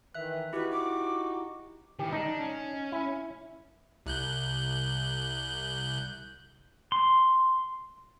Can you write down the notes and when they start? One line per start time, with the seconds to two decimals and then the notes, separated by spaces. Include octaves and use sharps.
0.15 D#3 E3 E5 F#6
0.53 D#4 E4 F#4 G4 B4
0.71 D6
1.99 D#3 E3 G4
2.13 D4 D#4
2.40 C#4
2.92 E4
4.06 C2 F#6 G6
6.92 C6